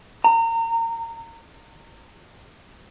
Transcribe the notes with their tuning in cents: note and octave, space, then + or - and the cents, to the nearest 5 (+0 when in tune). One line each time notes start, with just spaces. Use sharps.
A#5 -30